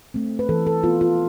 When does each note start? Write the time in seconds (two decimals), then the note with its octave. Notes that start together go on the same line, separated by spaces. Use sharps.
0.14 A3 C4
0.39 B4
0.49 E3 A4
0.67 A4
0.83 B3 F4
1.01 F4